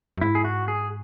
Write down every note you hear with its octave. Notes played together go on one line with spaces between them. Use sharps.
F#2
G#2 E4
G#4
F#4
G#4